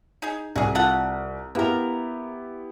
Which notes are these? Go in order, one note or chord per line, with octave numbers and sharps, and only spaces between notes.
D#4 G#4
C2 F#4 G#4
F4 A4 F#5
A#3 B3 E4 G4 A#4